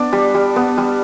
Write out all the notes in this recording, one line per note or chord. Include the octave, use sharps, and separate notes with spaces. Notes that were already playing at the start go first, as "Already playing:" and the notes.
Already playing: B3 D4 D5
G3
G3
B3
G3